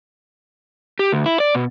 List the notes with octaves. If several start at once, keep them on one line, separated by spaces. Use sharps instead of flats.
G4
D2
E4
D5
B2